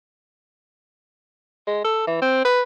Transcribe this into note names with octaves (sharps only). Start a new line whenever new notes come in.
G#3
A4
E3
C4
B4